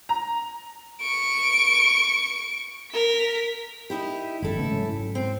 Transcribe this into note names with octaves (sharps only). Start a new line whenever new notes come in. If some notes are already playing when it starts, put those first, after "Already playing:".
A#5
C#6 D7
A#4 B6
D#4 E4 G4
G#1 F#2 E4 A4
C#3 A3 B3
G#2 F#3 C#4
C4